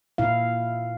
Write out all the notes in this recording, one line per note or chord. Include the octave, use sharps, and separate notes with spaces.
A#2 E4 F5